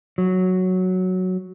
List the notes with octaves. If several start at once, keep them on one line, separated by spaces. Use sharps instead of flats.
F#3